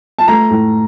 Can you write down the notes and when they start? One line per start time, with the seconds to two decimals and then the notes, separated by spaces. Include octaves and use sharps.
0.19 A5
0.28 A3 A#5
0.50 A2